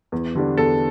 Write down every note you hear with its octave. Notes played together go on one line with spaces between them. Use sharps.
E2
D3 G3 D4
E2 A4